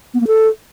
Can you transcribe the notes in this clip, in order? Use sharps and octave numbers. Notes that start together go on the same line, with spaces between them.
B3
A#3
A4